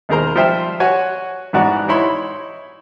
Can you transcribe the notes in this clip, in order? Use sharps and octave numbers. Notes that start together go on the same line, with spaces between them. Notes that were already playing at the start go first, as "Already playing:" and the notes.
D#2 B2 G#4 A#4 C5 A#5
F3 G3 C5 E5 G5
F#4 C#5 G#5
A1 G#2 B3 F#4 D5 C#6
D#4 E4 C#5 B5 C6